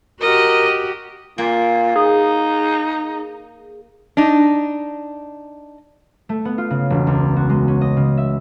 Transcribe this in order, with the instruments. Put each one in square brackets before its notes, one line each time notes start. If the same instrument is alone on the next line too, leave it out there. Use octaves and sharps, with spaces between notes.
[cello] F#4 G4 [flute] A#4 [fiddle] D#5
[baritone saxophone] A#2 [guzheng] A#3
[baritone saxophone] D#4 [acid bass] G#4
[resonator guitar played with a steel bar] D4 D#4
[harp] A3
B3
F4
C#3
E1
C#2
F#4
G#3
C#4
D#5
C#3
E5